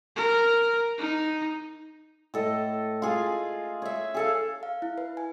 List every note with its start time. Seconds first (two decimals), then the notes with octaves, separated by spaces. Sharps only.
0.16 A#4
0.98 D#4
2.34 A2 A4 D#5
3.02 F4 G#4 F5
3.82 C#5 E5
4.14 G#4 A4 F5
4.63 F5
4.82 E4
4.98 B4
5.17 G#5